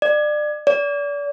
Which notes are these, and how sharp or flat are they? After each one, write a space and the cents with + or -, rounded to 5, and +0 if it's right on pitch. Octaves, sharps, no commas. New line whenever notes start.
D5 +30
D5 -35